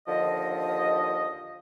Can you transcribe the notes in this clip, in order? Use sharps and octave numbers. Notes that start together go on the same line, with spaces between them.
D#2 D3 F3 D#5